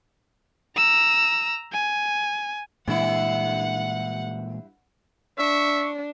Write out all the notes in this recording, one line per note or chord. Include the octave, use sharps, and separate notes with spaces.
A#5 E6
G#5
G2 A#2 E3 G#3 E4 F#5
D4 E5 C#6